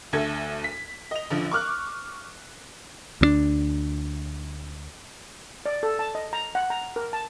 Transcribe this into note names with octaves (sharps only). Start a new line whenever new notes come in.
D2 A3 A4 G#6
B6
D#5 F7
A1 D3 F3
C#6 D6 F6 F#6
D2 A#3 D4
D5
A4
A5
D#5
A#5
F#5
A#5
A#4
A5